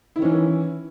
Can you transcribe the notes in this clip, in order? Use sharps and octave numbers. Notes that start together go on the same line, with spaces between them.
D#3 E3 C#4 E4